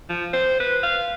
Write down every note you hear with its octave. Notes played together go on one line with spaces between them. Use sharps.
F3
C5
B4
F5